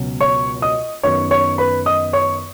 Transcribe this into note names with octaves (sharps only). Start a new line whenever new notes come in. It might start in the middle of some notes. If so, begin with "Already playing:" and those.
Already playing: C#2 B2 F#3 C#4
C#5 C#6
D#5 D#6
F#2 D#3 B3 C#5 C#6
C#5 C#6
B4 B5
D#5 D#6
C#5 C#6